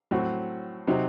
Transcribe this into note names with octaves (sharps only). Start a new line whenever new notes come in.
A2 F#3 C4 F#4
C3 F#3 C4 D#4